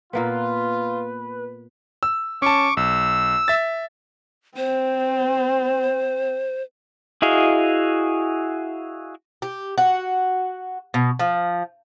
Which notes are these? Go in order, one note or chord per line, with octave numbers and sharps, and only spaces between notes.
A#2 A#3 B3 F4 B4
E6
C#4 A5 C#6 D6
B1 E6
E5 A6
C4 C5
E4 F#4 G#4 D#5 F5
G4
F#4
B2
F3